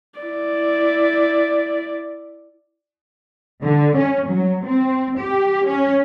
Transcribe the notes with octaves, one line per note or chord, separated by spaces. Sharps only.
E4 D5
D3
C#4
F#3
C4
G4
C#4